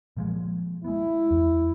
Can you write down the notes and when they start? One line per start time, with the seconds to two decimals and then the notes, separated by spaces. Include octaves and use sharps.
0.17 A#2 F3 G#3
0.84 G#3 B3 E4
1.31 E2